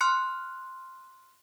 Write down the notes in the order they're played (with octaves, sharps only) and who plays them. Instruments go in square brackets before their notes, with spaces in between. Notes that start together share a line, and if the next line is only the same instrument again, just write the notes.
[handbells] C6 F6 F#6 C#7